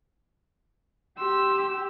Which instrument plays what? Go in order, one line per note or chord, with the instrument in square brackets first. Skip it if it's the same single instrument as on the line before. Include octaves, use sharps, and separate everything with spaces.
[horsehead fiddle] G4 [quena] C6 [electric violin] E6